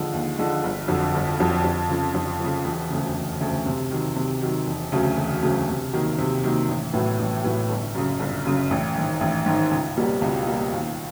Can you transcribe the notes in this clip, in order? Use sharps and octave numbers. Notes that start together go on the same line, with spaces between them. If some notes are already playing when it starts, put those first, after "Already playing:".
Already playing: D#2 D3 F3 G#3
D#2
D3 F3 G#3
G1
F2 D3 F#3
G1
F2 D3 F#3
F2
C#3 F3
F2
C#3 F3
E1
D2 C#3
E1
D2 C#3
C3
D#3 F#3
C3
D#3 F#3
E1
D2 C#3 F#3
E1
D2 C#3 F#3
C3
D#3 F#3 A#3
C3
D#3 F#3 A#3
A1
A2 F#3 B3 E4
A1
A2 F#3 B3 E4
G1
F#2 C#3
G1
F#2 C#3
A1
G#2 D#3
A1
G#2 D#3
C#2
B2 G3 A#3
C#2
B2 G3 A#3
D#2